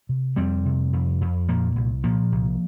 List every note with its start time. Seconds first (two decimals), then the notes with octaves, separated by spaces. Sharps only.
0.09 C3
0.36 F2 G3 C4
0.65 C3
0.93 F2
1.21 F2
1.48 A#2 F3 A#3
1.76 C2
2.04 A#2 F3 A#3
2.32 C2